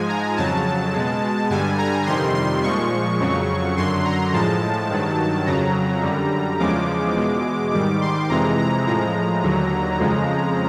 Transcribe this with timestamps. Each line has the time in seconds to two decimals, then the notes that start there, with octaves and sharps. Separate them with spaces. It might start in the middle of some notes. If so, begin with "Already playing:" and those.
Already playing: G#2 F3 G#3 G#5
0.09 A#5
0.37 F2 C#3 F#3 A5
0.93 B2 G#3
1.50 G2 D3 G3 G#5
1.78 A#5
2.06 F2 C3 D#3 G3 C6
2.35 C6
2.63 A#2 F3 G#3 C#6
3.20 F2 C#3 F#3
3.77 F#2 D3 F#3 C6
4.05 A#5
4.33 A2 F3 G#3 A5
4.90 G2 D#3 F#3
5.46 F2 C#3 F#3 A#5
6.03 F#2 D3 G3
6.60 E2 C#3 F3 G#3 D6
7.16 E2 B2 G#3
7.73 G#2 D#3 G3 D6
8.01 C6
8.30 F2 C3 E3 G#3 A#5
8.58 A#5
8.87 A2 F3 G#3 A#5
9.43 D#2 D3 F#3
9.99 F2 C#3 F3 G#3